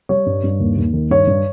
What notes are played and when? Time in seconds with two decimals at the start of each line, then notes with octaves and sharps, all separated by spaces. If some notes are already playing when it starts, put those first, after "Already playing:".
0.09 G3 C#5
0.26 G2
0.44 G2
0.60 D#2
0.77 D#2
0.93 D#3
1.10 G2 C#5
1.27 G2